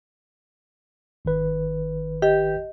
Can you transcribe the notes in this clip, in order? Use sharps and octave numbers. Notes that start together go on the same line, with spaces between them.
G#1 D#3 B4
G4 D#5